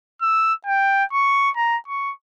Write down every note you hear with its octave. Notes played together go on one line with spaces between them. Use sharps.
E6
G5
C#6
A#5
C#6